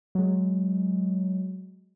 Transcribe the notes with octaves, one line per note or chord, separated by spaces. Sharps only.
F#3 G#3